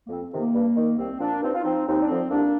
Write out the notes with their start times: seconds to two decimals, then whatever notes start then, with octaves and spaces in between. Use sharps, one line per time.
0.06 A#3
0.09 F2 C4
0.24 C4
0.32 C3 D#3
0.39 A#3
0.53 G2
0.76 D#3
0.98 C2 C4
1.20 A#2 F3 A#3 D4
1.41 G2 C4 D#4
1.54 F4
1.63 F3 C4 D#4
1.87 D#2 C4 D#4
2.01 D4
2.07 D3 F3 C4
2.30 C2 A#3 D4